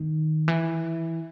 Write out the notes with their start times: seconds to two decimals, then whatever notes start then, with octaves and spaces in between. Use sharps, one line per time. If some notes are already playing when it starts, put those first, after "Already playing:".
Already playing: D#3
0.48 E3